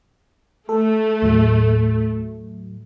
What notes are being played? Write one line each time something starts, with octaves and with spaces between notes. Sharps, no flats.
A3 A4
D#2 A2 F#3